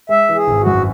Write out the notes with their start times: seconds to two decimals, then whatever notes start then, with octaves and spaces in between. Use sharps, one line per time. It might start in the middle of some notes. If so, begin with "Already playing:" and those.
0.09 G#3 E5
0.29 E3
0.35 G#4
0.47 G#1
0.61 F#4
0.66 F#2